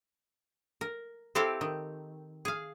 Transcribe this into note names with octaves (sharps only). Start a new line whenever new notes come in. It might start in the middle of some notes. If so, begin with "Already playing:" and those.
A#4
C4 E4 G4 A4 C5 F5
D#3
G#4 F5